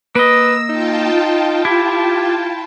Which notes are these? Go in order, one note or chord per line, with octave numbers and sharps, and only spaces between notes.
A#3 B4 D#5 E6
D#4 F4 G5 A5
E4 G4